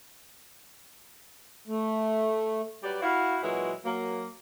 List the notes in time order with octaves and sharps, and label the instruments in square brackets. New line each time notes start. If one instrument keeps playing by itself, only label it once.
[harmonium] A3
[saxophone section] F#3 G3 B4 D5
E4 F#4 F5
A#2 E3 F#3 G#3 E4 F#4
F#3 A#3